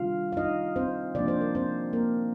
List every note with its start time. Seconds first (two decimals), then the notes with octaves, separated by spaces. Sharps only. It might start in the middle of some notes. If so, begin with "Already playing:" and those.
Already playing: C3 D#3 G3 D4 F4 F5
0.32 F5
0.37 D#4 D#5
0.76 C4 C5
1.14 C3 F3 A#3 D4 D5
1.28 C5
1.41 A#4
1.55 C4 C5
1.93 A#3 A#4